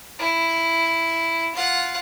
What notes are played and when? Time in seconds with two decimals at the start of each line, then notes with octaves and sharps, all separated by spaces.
0.19 E4
1.55 F4 F#5